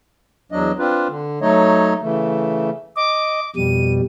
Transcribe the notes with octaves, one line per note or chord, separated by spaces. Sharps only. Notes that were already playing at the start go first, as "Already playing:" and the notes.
E2 F#3 D4 D#5
C4 D4 F4 B4
D3
F#3 A3 D#4 C#5 D#5
C#3 E3 A3
D#5 D6
F2 B2 G3 D#7